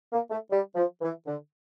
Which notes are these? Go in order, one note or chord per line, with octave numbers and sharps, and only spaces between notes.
A#3
A3
G3
F3
E3
D3